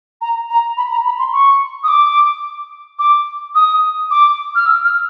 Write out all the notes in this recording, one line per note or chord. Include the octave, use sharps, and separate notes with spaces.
A#5
A#5
B5
A#5
B5
C6
C#6
D#6
D6
D6
D#6
D6
F6
E6
F6